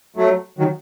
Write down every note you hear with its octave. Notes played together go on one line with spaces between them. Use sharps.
F#3 A3
D#3 F#3